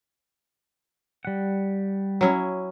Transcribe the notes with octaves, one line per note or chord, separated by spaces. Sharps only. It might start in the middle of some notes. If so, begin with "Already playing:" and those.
G3 F#5
F#3 C#4 E4